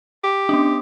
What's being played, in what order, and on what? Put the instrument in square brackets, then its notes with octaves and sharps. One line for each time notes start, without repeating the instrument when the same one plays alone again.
[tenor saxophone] G4
[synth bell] B3 C#4 D4